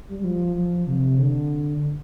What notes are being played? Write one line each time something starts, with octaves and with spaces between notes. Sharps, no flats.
G3
G3
F3
F3
C3
D3